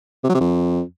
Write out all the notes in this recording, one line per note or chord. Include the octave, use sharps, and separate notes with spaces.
C3
F#3
C3
F2